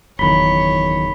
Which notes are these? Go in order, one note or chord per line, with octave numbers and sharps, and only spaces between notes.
F#1 E2 D#3 C#5 B5 B6 G7